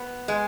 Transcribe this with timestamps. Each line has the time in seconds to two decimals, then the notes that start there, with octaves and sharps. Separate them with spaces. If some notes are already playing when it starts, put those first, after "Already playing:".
Already playing: B3
0.28 G#3